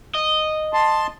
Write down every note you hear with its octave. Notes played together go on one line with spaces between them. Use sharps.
D#5
A5 C6